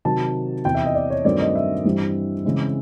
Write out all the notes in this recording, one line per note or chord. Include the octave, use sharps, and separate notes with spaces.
C3 D#3 F#3 A5
E2 C3 E3 G5
E5
D#5
D5
C#5
G2 D#3 F#3 A3 C4 D5
D#5
E5
G2 E3 G3 C4
C#3 E3 G#3 C4